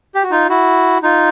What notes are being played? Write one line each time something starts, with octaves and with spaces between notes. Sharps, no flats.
G4
F#4
D#4 F4
E4 F#4
D#4 F4